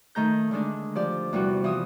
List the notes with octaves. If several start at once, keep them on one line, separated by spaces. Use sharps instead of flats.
D#3 A3 A#5 G6
D3 D#3 G#3 D4
F3 G4 D5
E2 C3 G3 B3 F#4
E3 F3 D#6 E6